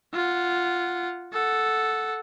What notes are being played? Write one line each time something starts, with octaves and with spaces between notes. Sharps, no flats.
F4 F#5
A4 F#5